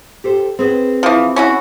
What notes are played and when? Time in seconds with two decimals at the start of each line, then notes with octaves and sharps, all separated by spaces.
0.24 G4 A4 C5
0.59 C4 G#4 B4
1.03 E3 F3
1.36 C#4 E4 F#4